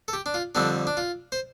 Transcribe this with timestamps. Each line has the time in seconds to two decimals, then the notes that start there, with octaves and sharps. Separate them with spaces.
0.08 A4
0.13 G4
0.26 D4
0.34 F4
0.55 F2 D3 G3 C4 D4
0.87 D4
0.97 F4
1.32 C5